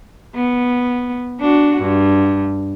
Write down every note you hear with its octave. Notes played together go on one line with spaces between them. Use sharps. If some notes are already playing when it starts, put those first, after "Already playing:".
B3
D4 F#4
G2